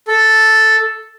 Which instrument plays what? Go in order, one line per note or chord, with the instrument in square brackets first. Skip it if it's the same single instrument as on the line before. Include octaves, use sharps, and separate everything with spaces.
[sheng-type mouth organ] A4